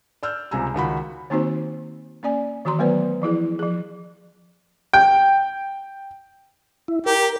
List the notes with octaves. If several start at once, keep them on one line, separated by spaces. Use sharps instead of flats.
D5 E6 F6 G6
C#2 C3 G3 G#5 A#5 E6
C#2 D#3 F#4 B5
D#3 A#3 C4 D#4 F#4 C5
A#3 C#4 D5 G#5
D#3 E3 F#4 A#5 C6
F#3 A3 B3 B4 C5 D5
E3 F3 E4 G#4
F3 G#4
G5
E4
G4 A#4